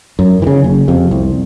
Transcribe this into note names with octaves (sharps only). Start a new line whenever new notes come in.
F#2
E3
C#3
F#1
F2 C3
C2